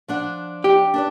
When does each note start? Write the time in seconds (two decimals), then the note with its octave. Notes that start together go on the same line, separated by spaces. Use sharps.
0.08 F3 D4 F#5
0.64 G4
0.94 D4 B4 D5